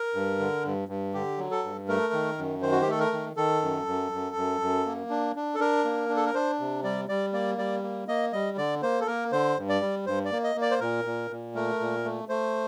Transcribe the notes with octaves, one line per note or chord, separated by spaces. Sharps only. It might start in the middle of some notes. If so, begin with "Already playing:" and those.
Already playing: A#4
G2
D3
G2
G2
D3 G4
F#3
A4
G2
A3 A#4
D#3
F#2
D#3 C5
F#4
G4
A3 A4
A#4
D#3
D#3 A4
F#2
F#2
F#2
F#2
F#2
A#3
D4
D4
A4
D4 A#4
A#3
D4
A4
A#4
D4 C5
C3
G3 D5
G3 D5
A#3 D5
G3 D5
A#3
A#3 D#5
G3 D#5
D3 D5
A#3 C5
A4
A#3 A#4
D3 C5
G2
D5
G3
G2 C5
D5
A#3
D#5
A#3
D5
C5
A#2 A#4
A#2
A#2
A3 A#4
A#2
A3
A3 C5